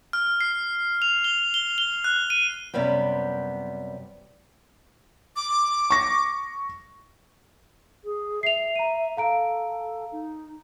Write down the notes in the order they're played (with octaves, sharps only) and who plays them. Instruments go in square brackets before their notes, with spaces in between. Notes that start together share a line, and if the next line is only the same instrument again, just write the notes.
[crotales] F6
C7
F7
G7
G7
G7
F#6
D#7
[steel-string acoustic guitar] F#2 C3 G3 B3 C4
[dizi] D6
[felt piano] C#6 A#6
[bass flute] G#4
[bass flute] E5 [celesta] C7 F7
[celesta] A#5 D#7
[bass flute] A4 [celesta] F5 A#5 D7
[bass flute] D#4